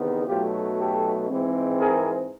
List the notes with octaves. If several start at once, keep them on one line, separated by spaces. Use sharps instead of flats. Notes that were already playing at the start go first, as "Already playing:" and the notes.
Already playing: E2 C3 D#3 B3
B1 B2 F#3 A3 F4 G4
G4 A4
G#2 E3 G#3 C4
G#4 A#4